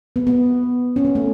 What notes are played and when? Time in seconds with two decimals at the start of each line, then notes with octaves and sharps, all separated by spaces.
0.16 B3
0.27 B3
0.96 C#4
1.05 B3
1.15 A3